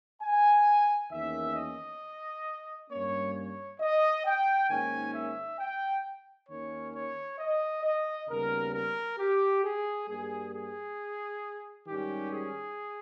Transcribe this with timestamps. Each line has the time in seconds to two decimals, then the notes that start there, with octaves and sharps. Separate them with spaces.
0.22 G#5
1.11 E2 D#3 A#3 C#4 E5
1.56 D#5
2.90 G2 G3 A#3 C#4 C#5
3.35 C#5
3.80 D#5
4.25 G5
4.69 G#2 D#3 A#3 C#4 G#5
5.14 E5
5.59 G5
6.49 D#2 D#3 A#3 C#4 C#5
6.94 C#5
7.39 D#5
7.84 D#5
8.29 D#2 C#3 G3 B3 A#4
8.74 A#4
9.18 G4
9.64 G#4
10.08 G2 G3 A#3 G#4
10.53 G#4
11.87 G#2 D#3 G3 C#4 G4
12.32 G#4